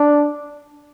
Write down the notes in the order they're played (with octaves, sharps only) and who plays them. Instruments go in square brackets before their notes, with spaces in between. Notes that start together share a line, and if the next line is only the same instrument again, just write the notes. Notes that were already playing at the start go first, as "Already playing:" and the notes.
Already playing: [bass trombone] D4